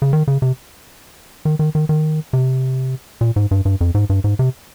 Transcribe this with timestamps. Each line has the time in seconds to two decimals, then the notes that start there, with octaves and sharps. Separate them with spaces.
0.02 C#3
0.13 D#3
0.28 C#3
0.42 C3
1.45 D#3
1.59 D#3
1.75 D#3
1.89 D#3
2.33 C3
3.21 A#2
3.36 G#2
3.51 G2
3.65 G2
3.81 F2
3.94 G#2
4.10 G2
4.24 G#2
4.39 C3